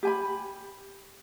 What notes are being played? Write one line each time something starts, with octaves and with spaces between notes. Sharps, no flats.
G4 G#5 B5